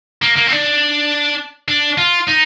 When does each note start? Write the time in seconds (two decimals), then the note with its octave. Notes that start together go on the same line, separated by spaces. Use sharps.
0.22 A#3
0.36 A#3
0.46 C4
0.51 D4
1.68 D4
1.98 F4
2.27 D#4